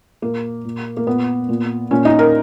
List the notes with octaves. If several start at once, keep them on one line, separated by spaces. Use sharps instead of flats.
A#2 A#3
A#2
A#3
A#2 B3
A#2
A#2 C#4
D#4
A#4